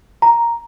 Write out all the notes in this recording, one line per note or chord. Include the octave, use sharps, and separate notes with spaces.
A#5